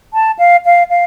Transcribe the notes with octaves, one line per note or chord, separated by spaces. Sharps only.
A5
F5
F5
F5